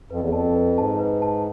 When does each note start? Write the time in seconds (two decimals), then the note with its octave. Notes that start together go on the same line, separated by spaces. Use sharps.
0.11 F2 B4
0.20 E2
0.30 F2 A5
0.55 B4
0.77 G#2 A5
0.99 B4
1.22 A5